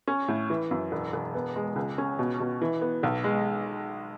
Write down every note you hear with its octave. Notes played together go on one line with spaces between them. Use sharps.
C#4
A2
E3
F#2
E1
E1
B3
G#3
C#2
C#4
B2
B2
E3
B3
B1
G#3